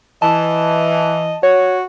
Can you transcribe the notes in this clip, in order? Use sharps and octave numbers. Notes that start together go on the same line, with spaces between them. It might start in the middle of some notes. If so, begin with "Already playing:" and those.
E3 D#5 A5
F#4 C#5